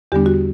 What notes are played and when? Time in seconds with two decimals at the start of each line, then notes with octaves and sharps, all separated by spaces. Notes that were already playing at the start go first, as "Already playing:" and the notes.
0.12 E2 D3 G3 B3 D4 G4
0.26 F#4